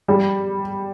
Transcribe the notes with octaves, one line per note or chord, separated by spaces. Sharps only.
G3